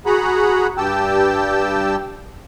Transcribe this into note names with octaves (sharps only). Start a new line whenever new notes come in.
F#4 G#4 F#5 A#5 B5
G2 G4 G5 A5 E6